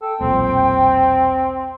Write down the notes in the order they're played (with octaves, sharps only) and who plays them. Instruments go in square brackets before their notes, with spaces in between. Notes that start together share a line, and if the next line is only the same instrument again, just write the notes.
[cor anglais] A4 [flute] G5
[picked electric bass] E1 B1 A#2 [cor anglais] C4